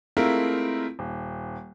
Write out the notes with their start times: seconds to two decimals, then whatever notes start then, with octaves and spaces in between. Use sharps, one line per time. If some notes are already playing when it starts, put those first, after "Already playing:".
0.17 G#3 A3 C4 E4 F4 A#4
0.99 D#1